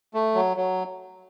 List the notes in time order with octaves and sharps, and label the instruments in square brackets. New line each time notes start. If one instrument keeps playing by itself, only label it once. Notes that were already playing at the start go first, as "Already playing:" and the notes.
[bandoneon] A3
F#3
F#3